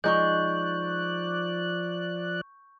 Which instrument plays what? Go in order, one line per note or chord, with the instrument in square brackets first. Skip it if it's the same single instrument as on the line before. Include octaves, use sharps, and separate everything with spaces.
[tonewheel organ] F3 D5 F#6 [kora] G#3 D#4 [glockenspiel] C#6 G6